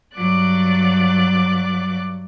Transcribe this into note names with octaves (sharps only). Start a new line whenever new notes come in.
G2 F#3 D5 D6 F#6